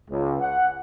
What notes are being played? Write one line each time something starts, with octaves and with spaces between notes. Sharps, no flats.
C#2
F#5